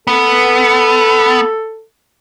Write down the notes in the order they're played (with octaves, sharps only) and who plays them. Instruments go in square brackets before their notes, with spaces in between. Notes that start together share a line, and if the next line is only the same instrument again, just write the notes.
[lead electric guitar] B3 [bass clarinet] A4